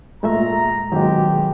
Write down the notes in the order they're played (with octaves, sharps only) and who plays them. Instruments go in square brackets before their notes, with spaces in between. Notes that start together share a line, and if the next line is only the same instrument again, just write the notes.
[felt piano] A#2 [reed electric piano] G#3 A3 E5 [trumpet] A#5
[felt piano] G#1 B2 [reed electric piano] F#3 G#3 [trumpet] G4